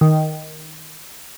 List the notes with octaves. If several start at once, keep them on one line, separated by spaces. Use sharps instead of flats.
D#3